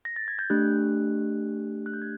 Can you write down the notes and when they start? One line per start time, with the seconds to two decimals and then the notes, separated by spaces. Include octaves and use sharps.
0.05 A#6
0.16 A6
0.28 G#6
0.39 G6
0.50 A3 D4 G4 F#6
1.86 F#6
1.93 G6
2.02 G#6